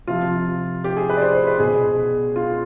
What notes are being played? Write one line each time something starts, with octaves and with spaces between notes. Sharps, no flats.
C3 F3 F4
G4
G#4
B4
D5
C5
C5
B4
B2 G#4
F4